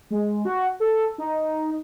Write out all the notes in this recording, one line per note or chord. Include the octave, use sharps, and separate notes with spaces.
G#3
F#4
A4
D#4